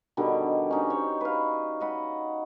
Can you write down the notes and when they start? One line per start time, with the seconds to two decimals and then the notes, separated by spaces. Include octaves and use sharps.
0.17 B2 D3 D#3 G3
0.71 C#4 D#4
0.90 C5 C#5
1.21 B4 F5
1.80 D#5 F#5 B5